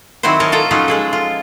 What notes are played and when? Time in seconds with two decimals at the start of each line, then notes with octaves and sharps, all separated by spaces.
0.23 D#3 F#3 C4 E4 F#4 C5
0.40 A#4 C#5 D#5 A5
0.52 F4 A4 A#5
0.71 F3 F#3 C#4 D#4 F4
0.88 G#3 G#4 A4
1.13 F4